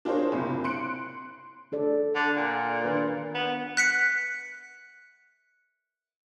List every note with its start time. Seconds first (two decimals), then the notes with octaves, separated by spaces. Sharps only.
0.05 D4 F4 G#4 A#4 C5 C#5
0.32 F#1 C3
0.64 C6 F#6 C#7 D7
1.72 D4 A4 D5
2.15 D3
2.36 A#2
2.84 D#3 D4 B4
3.35 B3
3.77 F#6 B6 C#7